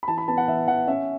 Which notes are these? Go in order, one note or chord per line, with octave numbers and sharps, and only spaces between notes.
B5
E3 A5
B5
B3 A5
F#5
E3 E5
E3 F#5
C#4 E5